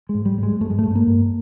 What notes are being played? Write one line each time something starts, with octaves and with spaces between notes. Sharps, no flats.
G#3
G#2
G3
G#2
G#3
G2 A3
G#3
G2 A3
A#3
G2